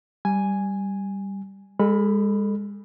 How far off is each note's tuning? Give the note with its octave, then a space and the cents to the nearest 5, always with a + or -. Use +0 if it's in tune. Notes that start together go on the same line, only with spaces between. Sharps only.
G3 +0 G#5 +0
G#3 -35 A4 +0 B5 +0